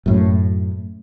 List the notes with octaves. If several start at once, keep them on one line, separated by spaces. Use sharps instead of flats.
F#2 A2